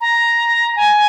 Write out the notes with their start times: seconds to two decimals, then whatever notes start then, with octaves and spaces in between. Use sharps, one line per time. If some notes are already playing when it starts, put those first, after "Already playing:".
0.01 A#5
0.76 G#5